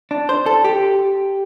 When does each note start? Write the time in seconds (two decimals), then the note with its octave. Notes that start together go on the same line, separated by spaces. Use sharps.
0.11 D4
0.29 C5
0.46 A4
0.64 G4